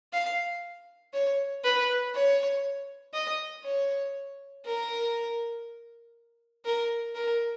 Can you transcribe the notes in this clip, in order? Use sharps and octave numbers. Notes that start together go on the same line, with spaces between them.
F5
C#5
B4
C#5
D#5
C#5
A#4
A#4
A#4